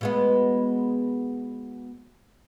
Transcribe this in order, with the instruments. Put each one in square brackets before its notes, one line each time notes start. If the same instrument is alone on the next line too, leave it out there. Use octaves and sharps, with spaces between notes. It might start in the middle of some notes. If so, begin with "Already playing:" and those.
[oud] B2 G#3 B3